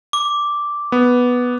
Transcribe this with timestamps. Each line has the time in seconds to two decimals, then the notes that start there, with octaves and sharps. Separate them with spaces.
0.13 D6
0.92 B3